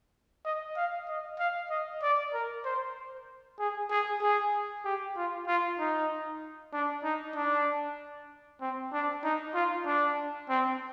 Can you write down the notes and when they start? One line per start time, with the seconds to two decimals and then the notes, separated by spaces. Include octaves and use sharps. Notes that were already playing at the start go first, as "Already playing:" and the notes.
0.45 D#5
0.77 F5
1.08 D#5
1.39 F5
1.70 D#5
2.02 D5
2.33 A#4
2.65 C5
3.59 G#4
3.90 G#4
4.21 G#4
4.85 G4
5.16 F4
5.47 F4
5.79 D#4
6.73 D4
7.04 D#4
7.35 D4
8.61 C4
8.92 D4
9.24 D#4
9.54 F4
9.86 D4
10.49 C4